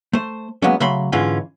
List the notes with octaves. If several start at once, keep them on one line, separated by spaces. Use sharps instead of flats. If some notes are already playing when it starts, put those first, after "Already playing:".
A3 C5
F#3 G#3 A#3 B3 C#4
C#3 F#3 A3 B5 C6
G#2 D3 E3 G#3 C#4 F4